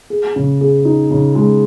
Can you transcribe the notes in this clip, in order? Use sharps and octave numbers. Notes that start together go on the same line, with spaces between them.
G#4
C#3
G#4
D#4
C#3
G#3